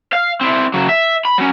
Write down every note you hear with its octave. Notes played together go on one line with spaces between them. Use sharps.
F5
C4 E4
C#3 F#3
E5
B5
F#3 C#4